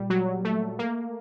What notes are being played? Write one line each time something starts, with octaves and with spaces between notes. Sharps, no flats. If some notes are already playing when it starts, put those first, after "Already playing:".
Already playing: A#2 G3
F#3
A3
A#3